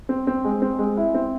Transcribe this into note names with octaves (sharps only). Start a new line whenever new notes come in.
C4
C4
G#3
C4
G#3
E4
C4